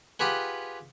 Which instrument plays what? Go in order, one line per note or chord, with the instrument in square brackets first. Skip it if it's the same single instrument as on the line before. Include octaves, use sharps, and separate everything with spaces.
[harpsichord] F4 G4 G#4 B4 F#5